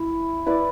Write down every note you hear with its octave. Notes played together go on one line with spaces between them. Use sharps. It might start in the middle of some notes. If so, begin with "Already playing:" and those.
Already playing: E4
E4 B4 D5